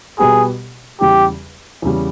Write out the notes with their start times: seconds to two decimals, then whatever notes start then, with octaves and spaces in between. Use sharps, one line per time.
0.19 B2 G3 B3 G4 G#4
1.01 E2 C#3 G3 G4
1.82 E2 C#3 G3